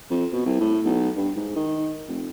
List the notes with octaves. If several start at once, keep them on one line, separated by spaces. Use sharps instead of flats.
F2
B2
C2
A2
B1
G2
G#2
D#3
F1